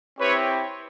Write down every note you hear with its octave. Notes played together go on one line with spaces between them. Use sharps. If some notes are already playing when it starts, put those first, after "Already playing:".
C4 E4 G4 B4 C#5